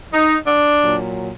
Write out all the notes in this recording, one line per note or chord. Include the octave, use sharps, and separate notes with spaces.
D#4
D4
A#2 F#3